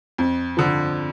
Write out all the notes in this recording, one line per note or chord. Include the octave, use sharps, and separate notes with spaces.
F2
D3 F3